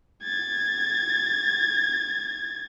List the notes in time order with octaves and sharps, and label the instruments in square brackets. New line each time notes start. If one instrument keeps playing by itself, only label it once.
[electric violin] G#6 A6